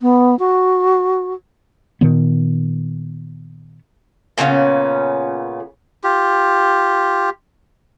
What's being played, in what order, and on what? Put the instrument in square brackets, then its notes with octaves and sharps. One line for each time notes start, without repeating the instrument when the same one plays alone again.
[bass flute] B3
F#4
[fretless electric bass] A#2 D#3 B3
[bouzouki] A#2 C#3 B3 C#4
[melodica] F4 G4